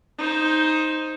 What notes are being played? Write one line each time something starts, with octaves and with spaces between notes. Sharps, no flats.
D#4 C5